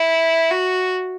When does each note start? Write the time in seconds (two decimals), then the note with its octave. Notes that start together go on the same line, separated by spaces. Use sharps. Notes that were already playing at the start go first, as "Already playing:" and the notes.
Already playing: E4
0.51 F#4